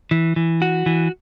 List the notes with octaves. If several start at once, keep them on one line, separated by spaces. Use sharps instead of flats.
E3
E3
F#4
E3